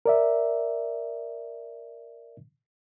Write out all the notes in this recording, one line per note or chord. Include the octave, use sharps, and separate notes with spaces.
A#4 D5 E5